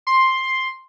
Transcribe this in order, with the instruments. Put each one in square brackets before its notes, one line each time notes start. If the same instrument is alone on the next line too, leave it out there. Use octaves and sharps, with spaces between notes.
[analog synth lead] C6